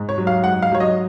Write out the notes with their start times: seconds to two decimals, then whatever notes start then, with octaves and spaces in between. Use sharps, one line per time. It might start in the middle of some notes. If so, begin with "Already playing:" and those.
Already playing: G#2
0.09 C#5
0.18 F#3
0.27 F5
0.44 G#2 F#5
0.63 F5
0.72 F#3 C#5
0.80 D#5